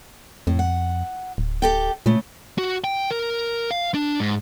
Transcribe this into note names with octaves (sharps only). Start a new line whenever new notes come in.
F2 A2
F#5
D1
G4 A4 G5
A#2 C#3 A3
F#4
G5
A#4
F5
D4
G#2